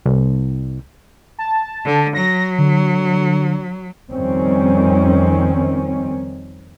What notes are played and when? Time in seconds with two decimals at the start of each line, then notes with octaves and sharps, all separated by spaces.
0.06 C2
1.39 A5
1.85 D3
2.15 F#3 A#6
2.59 D3
4.11 F2 D#3 G3 C4 C#4